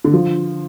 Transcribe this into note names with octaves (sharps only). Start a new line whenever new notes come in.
D3
F3